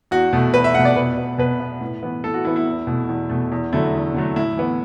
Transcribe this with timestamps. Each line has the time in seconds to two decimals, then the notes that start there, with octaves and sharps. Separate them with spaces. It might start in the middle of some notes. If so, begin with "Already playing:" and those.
0.11 E2 F#4
0.33 B2 A3
0.54 E2 B4
0.64 E5
0.75 B2 A3 F#5
0.85 D5
0.96 B2 B4
1.18 B3
1.38 B2 B4
1.60 B3
1.81 A2
2.03 E3 B3
2.24 A2 A4
2.34 F#4
2.45 E3 B3 E4
2.56 E4
2.66 E2
2.87 B2 A3
3.09 E2
3.29 B2 A3
3.52 E2
3.73 D3 F#3 A3 E4
3.93 E2
4.14 D3 F#3 A3
4.36 A2 E4
4.57 E3 B3